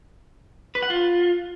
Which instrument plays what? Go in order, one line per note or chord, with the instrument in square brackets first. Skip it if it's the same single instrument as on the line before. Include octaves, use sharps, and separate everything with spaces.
[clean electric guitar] B4
F#5
F4